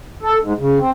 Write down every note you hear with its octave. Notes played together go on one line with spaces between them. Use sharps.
A4
G#2
C#3
C4